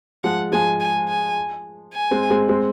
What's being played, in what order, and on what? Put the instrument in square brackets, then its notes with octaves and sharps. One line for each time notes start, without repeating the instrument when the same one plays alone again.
[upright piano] F3 G#3 [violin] F#5
[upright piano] F3 G#3 [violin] G#5
[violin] G#5
G#5
G#5
[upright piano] G#3 C4
G#3 C4
G#3 C4